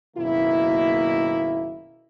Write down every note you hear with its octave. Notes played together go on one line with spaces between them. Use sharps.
F#1 B2 D#3 A#3 E4